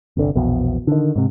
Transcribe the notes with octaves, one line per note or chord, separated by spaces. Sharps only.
G1 C2 D3
A#1 E2 B2
D3 D#3
G#2 C3